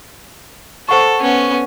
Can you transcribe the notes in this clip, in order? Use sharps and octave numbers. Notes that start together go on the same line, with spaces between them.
A4 C5 F#5 C#6
B3 C#4